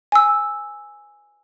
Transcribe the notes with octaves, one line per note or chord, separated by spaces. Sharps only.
G#5 E6